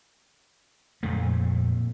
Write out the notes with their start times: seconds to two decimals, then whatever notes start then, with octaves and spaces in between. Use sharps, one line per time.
1.03 F2 A#2 A3